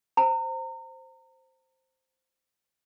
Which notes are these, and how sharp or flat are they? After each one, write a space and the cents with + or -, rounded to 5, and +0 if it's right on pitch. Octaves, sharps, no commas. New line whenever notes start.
C5 +0 A#5 -30